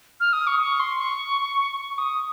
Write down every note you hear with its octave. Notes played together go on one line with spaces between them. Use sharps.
F6
D#6
C#6
C#6
C6
C#6
C#6
D#6